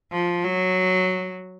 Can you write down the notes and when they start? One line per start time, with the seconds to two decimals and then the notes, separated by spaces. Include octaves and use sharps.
0.12 F3
0.44 F#3